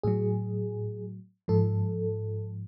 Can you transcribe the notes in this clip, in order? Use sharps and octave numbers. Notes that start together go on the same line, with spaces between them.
A2 F#3 G#4
G#2 F3 A4